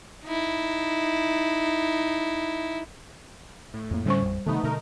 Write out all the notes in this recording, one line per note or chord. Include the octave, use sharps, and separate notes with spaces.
D#4 E4
A2
F2 A#3
D3 G3 C4 C#4 C5 C#6
A1 F2
C3 D#3 A3 B3 D#4
B2 D3 A3 D#4 A#4